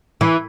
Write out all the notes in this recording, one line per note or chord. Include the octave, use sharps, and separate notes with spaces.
E3